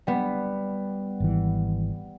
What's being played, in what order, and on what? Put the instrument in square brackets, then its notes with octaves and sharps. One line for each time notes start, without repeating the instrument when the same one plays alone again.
[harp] G3 B3
[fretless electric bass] G#1 E3